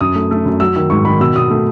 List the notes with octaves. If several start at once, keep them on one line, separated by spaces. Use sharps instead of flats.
F#2 D#6
A3
A3
F#2
F#3 E6
D#3 E6
G#2 C#6
D#3 B5
B2 E6
B2 D#6
A3